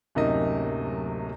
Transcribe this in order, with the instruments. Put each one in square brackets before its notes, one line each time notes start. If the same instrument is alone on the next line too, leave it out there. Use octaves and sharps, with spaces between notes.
[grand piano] D1 F#2 C3 A#3 D#4 D#5